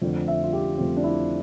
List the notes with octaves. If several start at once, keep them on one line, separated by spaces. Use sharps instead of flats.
F2 D3 A3 C4
E5
F4
G4
F2 D3 A3 C4
D4
E4